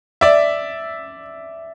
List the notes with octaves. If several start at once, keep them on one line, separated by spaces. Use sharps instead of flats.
D5 E5